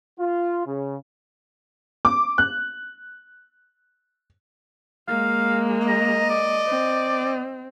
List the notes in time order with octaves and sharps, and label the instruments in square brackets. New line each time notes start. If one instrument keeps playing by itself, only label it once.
[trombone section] F4
C#3
[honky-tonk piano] D6
F#6
[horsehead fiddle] G#3 A#3 [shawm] F5
[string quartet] D#5 [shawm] A#5
[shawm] D5
[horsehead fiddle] C4